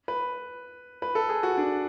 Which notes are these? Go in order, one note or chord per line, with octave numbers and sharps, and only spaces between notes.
B4
B4
A4
G#4
F#4
D4